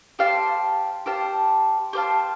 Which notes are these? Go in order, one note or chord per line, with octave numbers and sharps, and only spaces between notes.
G4 C5 F5 A5
G4 C5 F5 A5
G4 C5 F5 A5